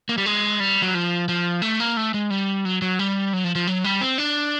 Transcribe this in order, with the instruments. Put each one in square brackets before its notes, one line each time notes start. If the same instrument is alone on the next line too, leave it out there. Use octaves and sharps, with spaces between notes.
[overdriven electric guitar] A#3
G3
G#3
G3
F#3
F3
F3
A3
A#3
A3
G#3
G3
F#3
F#3
G3
F#3
F3
F3
F#3
G3
C4
D4